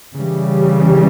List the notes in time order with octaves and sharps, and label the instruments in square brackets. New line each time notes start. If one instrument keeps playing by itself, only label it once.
[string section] C#3 E3 G3